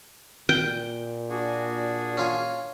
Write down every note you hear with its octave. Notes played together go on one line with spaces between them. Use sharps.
A#2 G5
D4 F#4 G#4
C#4 F4 G#5